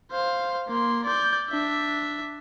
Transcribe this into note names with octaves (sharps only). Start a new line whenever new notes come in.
C5 F5
A#3 C6
D5 G6
D4 E5